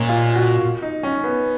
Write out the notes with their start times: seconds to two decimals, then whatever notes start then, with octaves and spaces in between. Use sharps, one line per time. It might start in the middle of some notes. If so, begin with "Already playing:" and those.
Already playing: A#2 G#3 A#3 C#4
0.09 F4
0.35 F#4
0.82 D#4
1.03 C#4
1.24 B3